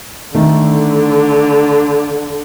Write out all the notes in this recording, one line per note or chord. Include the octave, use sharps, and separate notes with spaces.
D3 D#3 A3